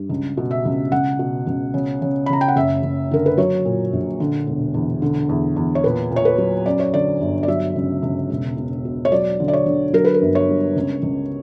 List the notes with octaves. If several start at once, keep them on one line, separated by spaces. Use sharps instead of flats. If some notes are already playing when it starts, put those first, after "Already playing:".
Already playing: G2
C#2
B2
E5
C#2
C#2 F#5
B2
C#2
C#3
C#3
B5
C#3 A#5
G5
F#5
F#1 E5
F#1
D3 A#4
B4
F#3 C#5
A#2
A#1
D3
E1
E2
D3
E2
E2
C#5
A#2 B4
A#2 C#5
B4
F#3
F#2 D5
C#5
D3 D5
G1
D5
F#3 E5
C#2
C#2
E1
E1
B2
C#5
F#3 D5
D3
D5
C#5
D3
F#3 A#4
B4
A#4
G1
C#5
G2
C#2
C#2